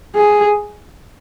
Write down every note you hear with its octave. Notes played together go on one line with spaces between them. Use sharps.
G#4